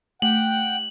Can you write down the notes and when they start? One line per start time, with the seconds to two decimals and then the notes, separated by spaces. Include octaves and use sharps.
0.22 A3 F#5 G5 F#7